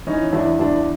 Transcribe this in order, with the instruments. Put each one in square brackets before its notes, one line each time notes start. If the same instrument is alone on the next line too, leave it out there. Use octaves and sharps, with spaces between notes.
[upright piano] E3 [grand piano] C#4 D#4
[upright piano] E2 [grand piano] D4 E4
[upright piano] E2 [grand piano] D4 E4